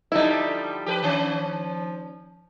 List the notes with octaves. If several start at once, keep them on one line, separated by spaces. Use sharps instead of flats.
D3 F3 G3 D#4 E4
F3 G4 A#4 B4
D#3 C#4